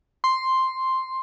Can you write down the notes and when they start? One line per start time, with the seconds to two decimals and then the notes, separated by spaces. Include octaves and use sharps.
0.24 C6